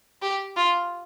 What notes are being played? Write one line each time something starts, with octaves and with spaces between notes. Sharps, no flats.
G4
F4